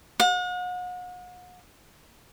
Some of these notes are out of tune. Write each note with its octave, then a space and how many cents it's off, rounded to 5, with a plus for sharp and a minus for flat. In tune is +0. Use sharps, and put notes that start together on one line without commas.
F#5 -40